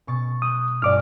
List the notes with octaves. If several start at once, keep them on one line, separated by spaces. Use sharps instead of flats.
B2 C#6 A6
D#6 F#6 G6
G1 C#5 D5 D6 F6